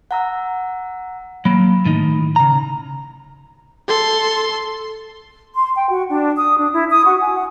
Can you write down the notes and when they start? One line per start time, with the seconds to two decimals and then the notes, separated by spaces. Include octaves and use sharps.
0.11 F#5 A#5 E6
1.45 F#3 A#3 B5
1.85 A2 D#3 D#4
2.36 C#3 A#5
3.88 A4 C6
5.55 C6
5.76 G5
5.89 F#4
6.10 D4
6.36 D#6
6.57 D4
6.72 E4
6.91 D#6
7.04 F#4
7.21 G#5
7.35 F#5